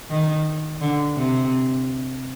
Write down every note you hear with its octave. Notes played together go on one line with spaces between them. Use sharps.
D#3
D3
C3